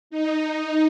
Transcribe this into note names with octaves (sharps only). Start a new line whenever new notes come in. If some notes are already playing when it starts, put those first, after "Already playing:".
D#4